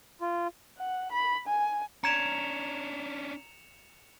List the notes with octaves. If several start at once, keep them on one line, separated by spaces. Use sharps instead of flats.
F4
F#5
B5
G#5
C#4 D4 A#5 G#6 C#7 D7 E7 F7